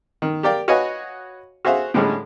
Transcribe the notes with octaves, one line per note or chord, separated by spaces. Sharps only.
D#3
G4 A#4 D5 F5 G5
F#4 B4 C#5 D#5 F5 G#5
F#4 G#4 C5 E5 F5
A2 D3 G3 G#3 C#4 G#4